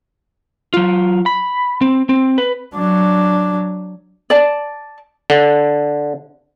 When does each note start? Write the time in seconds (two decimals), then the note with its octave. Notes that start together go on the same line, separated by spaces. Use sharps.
0.74 F#3 F4
1.26 B5
1.81 C4
2.09 C4
2.38 B4
2.75 F#3 D4
4.30 D5 A5
5.30 D3